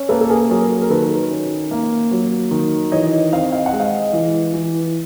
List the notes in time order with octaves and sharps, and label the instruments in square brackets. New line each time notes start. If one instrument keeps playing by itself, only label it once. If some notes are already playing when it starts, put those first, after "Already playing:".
Already playing: [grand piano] C#4
A#3 A4 B4
A4
G#4 A#4
F#3 G#4 A#4
A#4
D#3 A4 B4
C#4
A#3
F#3
D#3
E3 C#5 D#5
C4 D#5 F5
F5
F#5
G#3
D#5 F5
E3
E3